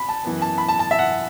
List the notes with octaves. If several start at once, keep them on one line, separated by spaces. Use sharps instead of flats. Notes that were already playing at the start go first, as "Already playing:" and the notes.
Already playing: B5
A5
F#2 E3 B3
A5
B5
A5
A5
E5
F#5